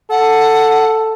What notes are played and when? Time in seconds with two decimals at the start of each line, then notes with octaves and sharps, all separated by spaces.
0.10 A4 F#5